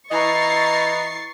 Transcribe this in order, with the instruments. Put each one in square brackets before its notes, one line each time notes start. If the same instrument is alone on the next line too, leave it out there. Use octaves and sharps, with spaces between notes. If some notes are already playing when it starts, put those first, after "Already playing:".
[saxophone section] E3 D#5 [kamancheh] A#5 [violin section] C#6 A6 C7